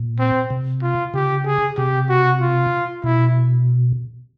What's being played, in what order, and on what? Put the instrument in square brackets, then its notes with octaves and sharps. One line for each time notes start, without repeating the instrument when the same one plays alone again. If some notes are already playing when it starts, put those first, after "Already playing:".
Already playing: [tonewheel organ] A#2
[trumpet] C4
[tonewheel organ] C3
[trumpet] F4
[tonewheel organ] C#3 [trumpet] G4
[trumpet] G#4
[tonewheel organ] C3 [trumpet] G4
[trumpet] F#4
F4
[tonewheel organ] B2 [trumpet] E4